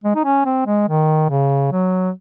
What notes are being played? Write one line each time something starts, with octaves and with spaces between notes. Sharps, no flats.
G#3
D#4
C#4
C4
G#3
D#3
C#3
F#3